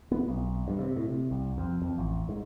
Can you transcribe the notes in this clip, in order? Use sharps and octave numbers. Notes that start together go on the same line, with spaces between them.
B3
B1
G2
C3
A2
C3
C2
F2
F2
A1
G#2